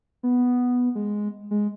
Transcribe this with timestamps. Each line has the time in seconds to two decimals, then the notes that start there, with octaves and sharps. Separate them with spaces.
0.23 B3
0.95 G#3
1.51 G#3